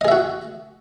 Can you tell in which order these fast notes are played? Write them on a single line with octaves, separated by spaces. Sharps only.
D#5 G#4 E5 F#4